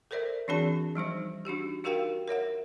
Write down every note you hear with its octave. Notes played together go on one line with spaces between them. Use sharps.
A4 A#4 C5 D5 E5
E3 C4 D4 F#4 G#4 A5
F3 G3 D#4 C5
D4 D#4 F#4 G4
D#4 F#4 G4 A#4 F5 G5
A#4 C#5 E5 F#5